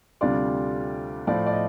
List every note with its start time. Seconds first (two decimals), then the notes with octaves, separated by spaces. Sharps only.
0.21 D2 C3 G3 D4 F4 D5
1.27 A2 F3 A3 D5
1.46 D5
1.53 D#5